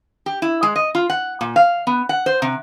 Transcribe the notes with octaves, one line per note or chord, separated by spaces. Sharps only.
G4
E4
G#3
D#5
F4
F#5
A#2
F5
B3
F#5
C5
C3